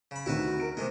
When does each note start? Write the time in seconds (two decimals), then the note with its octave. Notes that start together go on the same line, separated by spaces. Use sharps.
0.11 C#3 B5
0.26 D2 C3 D#3 E4 F#4 B4
0.60 A#4 D7
0.77 C3 D#3 G#3 A3